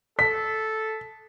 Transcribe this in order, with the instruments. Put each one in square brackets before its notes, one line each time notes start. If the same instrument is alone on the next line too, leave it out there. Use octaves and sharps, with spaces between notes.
[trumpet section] A4 [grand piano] B6